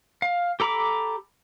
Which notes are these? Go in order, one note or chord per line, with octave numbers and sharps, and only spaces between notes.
F5
G4 A4 A#5 B5 D6